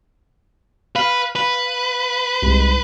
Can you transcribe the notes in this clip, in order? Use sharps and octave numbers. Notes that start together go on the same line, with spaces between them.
B4 F5
B4
C2 G#2